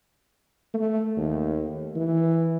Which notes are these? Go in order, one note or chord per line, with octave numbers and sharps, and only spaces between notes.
A3
D#2
E3